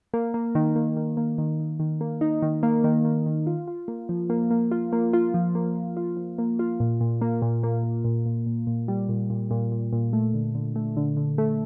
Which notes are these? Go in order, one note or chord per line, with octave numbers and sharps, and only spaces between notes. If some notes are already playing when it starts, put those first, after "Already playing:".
A#3
A#3
D#3
A#3
D#3
A#3
D#3
D#3
D#3
A#3
D#4
D#3
A#3
D#3
D#3
D#3
F4
F4
A#3
F3
A#3
A#3
F4
A#3
F4
F3
A#3
A#3
F4
F3
A#3
F4
A#2
A#2
A#3
A#2
A#3
A#2
A#2
A#2
A#2
A#2
G3
A#2
A#2
A#2
A#2
A#2
A3
D3
D3
A3
D3
D3
A3